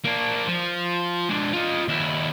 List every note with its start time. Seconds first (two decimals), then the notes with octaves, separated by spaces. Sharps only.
0.05 A#3 D4
0.47 F3
1.29 G#3 D4
1.53 F4 D#5
1.88 D#2 E4